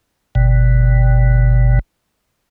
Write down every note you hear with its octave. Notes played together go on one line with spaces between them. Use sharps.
G1 B2